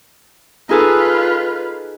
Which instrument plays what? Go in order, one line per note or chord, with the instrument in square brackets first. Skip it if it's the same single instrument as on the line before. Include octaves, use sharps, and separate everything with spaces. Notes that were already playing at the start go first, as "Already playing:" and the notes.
[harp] D#4 G#4 A4 [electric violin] F4 B4